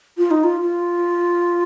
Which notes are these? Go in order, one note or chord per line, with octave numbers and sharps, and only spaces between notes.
F4
D#4
F4
F4